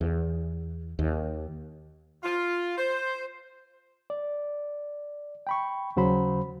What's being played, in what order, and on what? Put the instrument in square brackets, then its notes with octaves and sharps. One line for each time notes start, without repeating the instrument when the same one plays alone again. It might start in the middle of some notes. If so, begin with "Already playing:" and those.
[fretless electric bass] E2
D#2
[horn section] F4
C5
[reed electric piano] D5
G5 B5 C#6
D#2 C#3 F#3 C5 B5